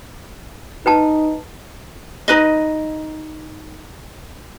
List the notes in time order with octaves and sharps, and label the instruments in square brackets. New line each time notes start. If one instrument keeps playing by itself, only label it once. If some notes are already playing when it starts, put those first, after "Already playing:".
[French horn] D#4 [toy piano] B4 G5 A5
[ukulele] D#4 B4 D#5